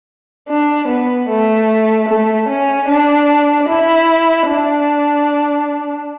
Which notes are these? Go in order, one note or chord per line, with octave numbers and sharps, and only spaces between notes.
D4
B3
A3
A3
C#4
D4
E4
D4